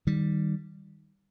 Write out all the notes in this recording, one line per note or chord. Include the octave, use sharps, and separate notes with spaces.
D#3 G3